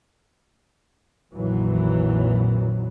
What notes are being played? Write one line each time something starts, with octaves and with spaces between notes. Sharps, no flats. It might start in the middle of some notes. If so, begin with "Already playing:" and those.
A#1 F2 A#2 D#3 E3 F#3